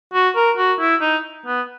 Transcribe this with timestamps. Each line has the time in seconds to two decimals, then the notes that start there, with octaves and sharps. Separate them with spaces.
0.14 F#4
0.36 A#4
0.58 F#4
0.80 E4
1.02 D#4
1.46 B3